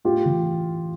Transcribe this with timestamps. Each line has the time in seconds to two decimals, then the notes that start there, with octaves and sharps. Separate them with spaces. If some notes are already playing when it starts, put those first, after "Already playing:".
0.05 A2 F4 G4
0.25 E3